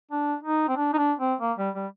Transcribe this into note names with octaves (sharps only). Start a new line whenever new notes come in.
D4
D#4
C4
D4
D#4
D4
C4
A#3
G3
G3